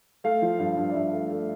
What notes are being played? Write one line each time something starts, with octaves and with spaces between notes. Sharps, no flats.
A3 F5
F3
G2 F5
G2
D5
G2 E5
A3
A3